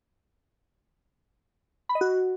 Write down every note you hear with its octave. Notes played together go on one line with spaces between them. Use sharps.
B5
D#5
F#4